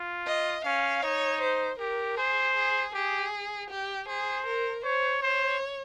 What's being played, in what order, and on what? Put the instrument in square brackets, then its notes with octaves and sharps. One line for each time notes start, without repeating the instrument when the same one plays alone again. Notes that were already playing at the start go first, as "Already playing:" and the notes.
Already playing: [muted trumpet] F4
[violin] D#5
[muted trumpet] C#4 [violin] F5
[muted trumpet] D#4 [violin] C#5
[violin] C5
[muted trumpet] G4 [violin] A#4
[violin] G#4 [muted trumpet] C5
[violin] G#4
[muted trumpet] G4 [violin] G#4
[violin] G4
[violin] G#4 [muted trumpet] C5
[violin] A#4
[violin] C5 [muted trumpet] C#5
[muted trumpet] C5 [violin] C#5